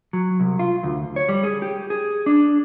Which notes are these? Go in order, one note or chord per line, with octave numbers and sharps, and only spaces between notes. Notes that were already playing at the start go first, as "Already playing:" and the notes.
F#3
C2
F4
D2
C#5
G3
G#4
G4
G#4
D4